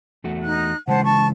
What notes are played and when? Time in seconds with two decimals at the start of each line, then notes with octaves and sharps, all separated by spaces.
0.24 E2 A3 F#4
0.42 D#4 F#6
0.88 C#3 E3 G#3 C5 F#5 A5
1.04 A5 C#6